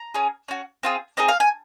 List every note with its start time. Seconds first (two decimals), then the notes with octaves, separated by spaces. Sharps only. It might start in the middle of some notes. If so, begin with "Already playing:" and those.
Already playing: A#5
0.15 C#4 G#4
0.48 C#4 F#4
0.83 C4 F4 G#4
1.17 C4 D#4 G#4 D#5
1.29 F5
1.40 G#5